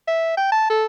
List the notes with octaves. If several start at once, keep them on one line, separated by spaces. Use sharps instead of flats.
E5
G5
A5
A4